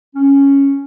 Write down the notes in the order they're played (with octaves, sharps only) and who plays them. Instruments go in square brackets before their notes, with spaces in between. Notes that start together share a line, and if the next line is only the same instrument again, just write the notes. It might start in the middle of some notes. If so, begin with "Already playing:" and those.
[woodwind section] C#4